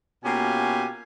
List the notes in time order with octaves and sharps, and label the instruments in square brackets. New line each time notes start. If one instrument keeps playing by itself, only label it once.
[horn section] B2 A#3 C#4 F4 G4 G#5